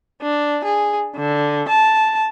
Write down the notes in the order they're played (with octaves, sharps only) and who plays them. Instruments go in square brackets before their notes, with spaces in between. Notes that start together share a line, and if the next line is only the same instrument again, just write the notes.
[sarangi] D4
G#4
D3
A5